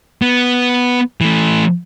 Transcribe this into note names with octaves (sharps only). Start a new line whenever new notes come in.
B3
E3 A3